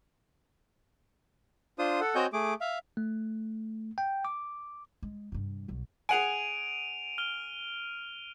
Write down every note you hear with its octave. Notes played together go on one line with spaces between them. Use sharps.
D4 F4 C5 D#6
A4 F#5
C4 F#4 C#5 D#5 G#5 G6
A3 G#4 D6
E5 F5
A3
G5
D6
G#3
G2 C3
B1 F#3
G#4 F#5 G#5 D7 D#7 F7
F6 G7